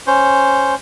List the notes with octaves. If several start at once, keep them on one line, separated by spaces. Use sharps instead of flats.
C#4 C5